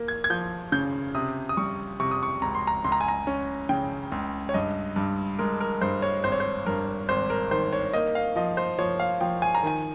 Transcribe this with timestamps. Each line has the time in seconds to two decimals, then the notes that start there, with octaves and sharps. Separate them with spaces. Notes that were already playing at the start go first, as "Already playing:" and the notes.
Already playing: A#3
0.08 G#6
0.24 G#6
0.30 F3 G6
0.72 C#3 G6
1.15 C3 D#6
1.49 D#6
1.57 G3 C#6
2.00 C3 C#6
2.11 D#6
2.23 C#6
2.42 C#2 A#5
2.55 C6
2.67 A#5
2.85 C#2 C6
2.92 A#5
3.01 G#5
3.08 A#5
3.27 C#4
3.69 C#3 G5
4.12 C#2
4.49 C#5
4.54 G2 D#5
4.96 G2
5.39 G#3 A#4
5.61 A#4
5.81 G2 C5
6.02 C#5
6.24 G#1 C5
6.32 C#5
6.40 C5
6.66 G2 A#4
7.09 G#1 C5
7.30 A#4
7.51 D#3 C5
7.73 C#5
7.93 A#3 D#5
8.15 F5
8.36 F3 D#5
8.57 C5
8.79 F3 C#5
9.00 F5
9.21 F3 G5
9.42 G#5
9.55 A#5
9.63 D#3 G#5